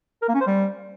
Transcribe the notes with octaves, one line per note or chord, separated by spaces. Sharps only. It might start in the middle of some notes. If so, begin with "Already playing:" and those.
A#4
A#3
C#4
C5
G3